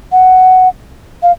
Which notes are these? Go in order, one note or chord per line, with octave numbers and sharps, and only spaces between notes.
F#5
F5